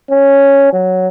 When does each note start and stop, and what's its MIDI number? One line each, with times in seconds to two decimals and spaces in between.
0.11 0.72 61
0.73 1.08 54